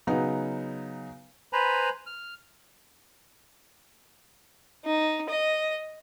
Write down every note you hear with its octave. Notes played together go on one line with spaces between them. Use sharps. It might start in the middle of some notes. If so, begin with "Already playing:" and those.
C#3 F#3 B3 D#4
B4 C5 G#5 A#5 B5
F6
D#4
D#5